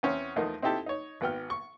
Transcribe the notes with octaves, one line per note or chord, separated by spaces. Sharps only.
E2 C4 C#4
E2 F3 A3 A#3 D#4
C4 D#4 E4 G4 A4
D#4 C#5
G#1 B3 G5 F6
C#6